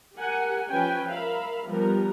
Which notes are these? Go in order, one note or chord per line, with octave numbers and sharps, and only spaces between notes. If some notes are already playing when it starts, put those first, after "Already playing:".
G4 A#4 F#5 G#5
F3 C#4 B4 G5 G#5
A#4 E5 F5 B5
F3 G3 B3 G4 A#4